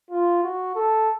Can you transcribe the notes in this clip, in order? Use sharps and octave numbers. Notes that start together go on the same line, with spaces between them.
F4
F#4
A4